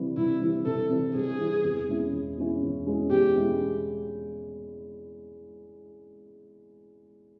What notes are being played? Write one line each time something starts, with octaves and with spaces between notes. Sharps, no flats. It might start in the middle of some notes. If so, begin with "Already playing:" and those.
Already playing: C3 E3 G3
C2 E4
C3 E3 G3
C2 A4
C3 E3 G3
C2 G#4
C3 E3 G3
E2
B2 G#3 C#4 E4
E2
B2 G#3 C#4 E4
E2
B2 G#3 C#4 E4
E2 G4
B2 G#3 C#4 E4